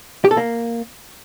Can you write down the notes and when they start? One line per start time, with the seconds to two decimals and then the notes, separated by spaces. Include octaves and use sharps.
0.25 G4
0.31 A4
0.37 A#3